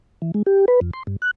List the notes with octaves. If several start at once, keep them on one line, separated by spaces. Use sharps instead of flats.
E3
G#3
G4
B4
F2
C6
G2
F#6